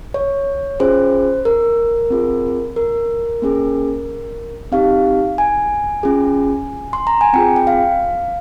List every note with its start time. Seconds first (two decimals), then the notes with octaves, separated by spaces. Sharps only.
0.14 C#5
0.80 C#4 F4 G#4 C5
1.45 A#4
2.10 C4 F4 G#4
2.76 A#4
3.42 A#3 C#4 G#4
4.72 C4 D#4 G4 F5
5.38 G#5
6.03 C#4 F4 G#4
6.93 C6
7.07 A#5
7.21 G#5
7.33 C4 F4 G#4 G5
7.56 G5
7.67 F5